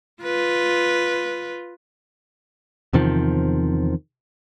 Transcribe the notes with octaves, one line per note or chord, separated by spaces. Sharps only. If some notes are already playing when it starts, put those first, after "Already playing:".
F4 B4
E2 C3 D#3 F3